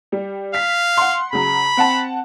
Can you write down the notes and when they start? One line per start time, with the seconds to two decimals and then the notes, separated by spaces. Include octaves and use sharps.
0.12 G3
0.55 F5 B6
0.97 F#5 C6
1.33 C#3 F#3 B5
1.77 C4 F#5 A5